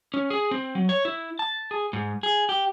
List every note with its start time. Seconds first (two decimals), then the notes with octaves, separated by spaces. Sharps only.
0.14 C#4
0.30 G#4
0.51 C4
0.75 F#3
0.89 C#5
1.05 E4
1.39 A5
1.71 G#4
1.93 G#2
2.23 G#4
2.49 G4